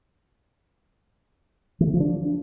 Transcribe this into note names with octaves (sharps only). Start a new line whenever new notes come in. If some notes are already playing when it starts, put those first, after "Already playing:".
E3
D3
F3
D4